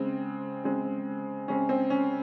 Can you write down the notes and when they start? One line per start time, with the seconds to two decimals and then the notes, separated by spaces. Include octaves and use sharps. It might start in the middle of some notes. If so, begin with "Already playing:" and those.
Already playing: C#3 G#3 C4
0.64 C#3 G#3 C4
1.48 C#3 G#3 C4 C#4
1.69 C4
1.90 C#4